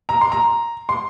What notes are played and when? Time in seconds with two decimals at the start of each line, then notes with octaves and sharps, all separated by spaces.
0.09 A#5
0.21 C6
0.32 A#5
0.89 C6